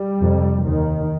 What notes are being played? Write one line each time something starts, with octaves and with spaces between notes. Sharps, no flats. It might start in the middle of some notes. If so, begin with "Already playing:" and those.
Already playing: G3
F2 C3
D#2 D#3